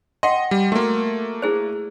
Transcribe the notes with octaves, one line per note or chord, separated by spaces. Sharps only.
D#5 F#5 G5 C6
G3
A3 A#3 F#4
E4 G#4 C5